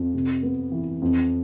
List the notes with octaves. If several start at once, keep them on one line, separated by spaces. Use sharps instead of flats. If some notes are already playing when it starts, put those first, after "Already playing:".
Already playing: F2
C3
B3
E3
F2